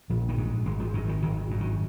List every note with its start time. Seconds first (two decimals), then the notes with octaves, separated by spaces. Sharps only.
0.10 A#1 F3
0.29 D#3
0.38 G#2
0.66 G#1 G#3
0.80 F3
0.94 F#2 D#3
1.09 D#3
1.22 G#1 D#3
1.51 F#2
1.61 D#3